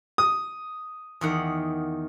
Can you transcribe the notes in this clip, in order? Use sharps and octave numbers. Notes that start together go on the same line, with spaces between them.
D#6
E2 D#3 F#5